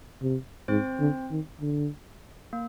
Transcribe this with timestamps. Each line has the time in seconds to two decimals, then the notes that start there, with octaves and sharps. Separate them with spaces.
0.22 C3
0.68 G#2 C4 C5
0.99 D3
1.30 D#3
1.61 D3
2.53 A#3